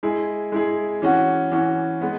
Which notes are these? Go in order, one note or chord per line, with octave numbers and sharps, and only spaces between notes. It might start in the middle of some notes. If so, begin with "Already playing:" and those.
G#3 E4 G#4
G#3 E4 G#4
E3 C#4 F#4
E3 C#4 F#4
G#3 B3